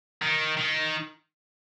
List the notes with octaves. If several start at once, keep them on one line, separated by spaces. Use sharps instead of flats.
D#3
D#3